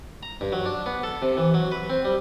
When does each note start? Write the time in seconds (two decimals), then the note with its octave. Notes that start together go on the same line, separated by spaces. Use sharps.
0.23 A#5
0.41 G2
0.52 F#3
0.66 D4
0.86 B3
1.03 A4
1.22 C3
1.37 E3
1.54 F#3
1.72 B4
1.90 C4
2.05 G3